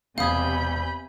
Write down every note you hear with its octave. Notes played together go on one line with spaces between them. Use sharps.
E1 C3 F5 G#5 B5 D#6 G6 G#6